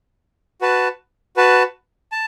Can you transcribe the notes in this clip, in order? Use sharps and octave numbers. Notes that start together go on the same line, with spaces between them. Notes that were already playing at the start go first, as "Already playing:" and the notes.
F#4 B4 A5
F#4 B4 A5
A5